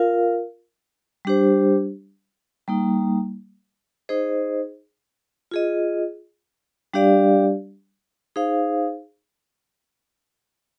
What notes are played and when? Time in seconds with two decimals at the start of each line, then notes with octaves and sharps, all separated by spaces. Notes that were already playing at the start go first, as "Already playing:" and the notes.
Already playing: F4 A#4 F5
1.25 G3 D4 G4 C5
2.68 G3 A#3 D#4
4.09 D#4 G#4 C5 D#5
5.51 F4 G#4 D#5
6.94 G3 D4 G4 D5 F5
8.36 D#4 G#4 C5 F5